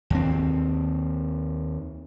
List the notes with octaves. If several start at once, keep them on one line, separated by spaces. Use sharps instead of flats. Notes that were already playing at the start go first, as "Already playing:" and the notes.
D#2 C4